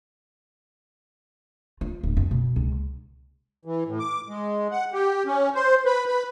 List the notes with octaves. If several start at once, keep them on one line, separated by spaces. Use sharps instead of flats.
F4
D1
F2
B2
C#2
E3
A2
D6
G#3
F#5
G4
C#4
C5
B4
B4